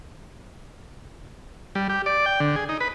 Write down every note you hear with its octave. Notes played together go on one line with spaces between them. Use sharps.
G3
G4
D5
G5
D3
G#4
D#4
B4